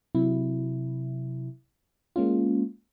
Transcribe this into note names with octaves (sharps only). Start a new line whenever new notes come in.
C3 F#3 E4
G#3 A#3 C#4 F4